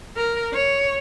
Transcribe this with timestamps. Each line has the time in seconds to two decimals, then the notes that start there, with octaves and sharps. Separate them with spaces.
0.16 A#4
0.53 C#5